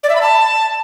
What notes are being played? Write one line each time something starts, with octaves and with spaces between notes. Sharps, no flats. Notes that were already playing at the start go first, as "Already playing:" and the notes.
D5
E5
B5
A5